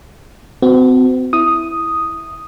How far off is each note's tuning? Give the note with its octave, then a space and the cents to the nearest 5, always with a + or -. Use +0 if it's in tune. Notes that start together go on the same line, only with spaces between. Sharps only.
C4 -40 F#4 +0
E4 +0 D#6 +0